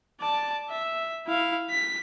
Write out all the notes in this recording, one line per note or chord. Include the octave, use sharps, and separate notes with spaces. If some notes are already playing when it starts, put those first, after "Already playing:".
D5 A5
E5
E4 F5
B6